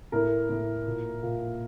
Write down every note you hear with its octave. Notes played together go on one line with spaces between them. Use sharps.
A2 A#4
A2
A#2
A#2